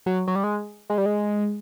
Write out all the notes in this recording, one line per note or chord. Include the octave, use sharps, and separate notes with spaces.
F#3
F#3
G3
G#3
G#3
G3
G#3